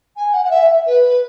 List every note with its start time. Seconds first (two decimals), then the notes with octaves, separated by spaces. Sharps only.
0.16 G#5
0.33 F#5
0.44 F#5
0.50 E5
0.86 B4